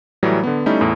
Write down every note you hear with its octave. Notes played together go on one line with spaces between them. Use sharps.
A2 E3 F#3 G3
D3 B3
G3 A3 C#4 D#4 E4
E2 A2